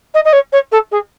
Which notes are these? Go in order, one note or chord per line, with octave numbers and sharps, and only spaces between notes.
D#5
D#5
C#5
C#5
A4
G#4